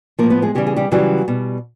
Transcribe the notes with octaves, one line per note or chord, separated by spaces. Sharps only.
A2 F3 A#3 A#4
B3 B4
G#3 G#4
C#3 E3 G3 G4
G#4
G3 G4
C#3 E3 F#3 G3 F#4
B2 G3